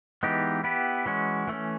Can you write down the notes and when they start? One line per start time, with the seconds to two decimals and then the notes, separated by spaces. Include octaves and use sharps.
0.23 E3 G#3 B3 D#4 G4
0.64 B3 E4 G4 B4
1.06 E3 G#3 C#4 F#4
1.48 E3 A3 C#4